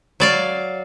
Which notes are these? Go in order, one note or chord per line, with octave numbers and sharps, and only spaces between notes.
F#3 D5 F5